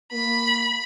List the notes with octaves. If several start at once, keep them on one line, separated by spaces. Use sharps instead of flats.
A#3 B5